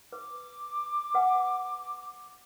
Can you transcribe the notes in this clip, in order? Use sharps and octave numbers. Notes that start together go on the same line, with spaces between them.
B4 D6
B4 F#5 G#5